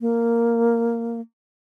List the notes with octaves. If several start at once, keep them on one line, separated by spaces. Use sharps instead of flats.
A#3